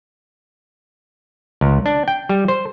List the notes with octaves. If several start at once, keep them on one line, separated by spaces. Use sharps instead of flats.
C#2
D4
G5
G3
C5